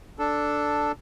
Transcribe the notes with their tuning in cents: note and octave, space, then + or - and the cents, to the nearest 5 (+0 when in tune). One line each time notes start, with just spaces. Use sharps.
D4 +0 A4 +0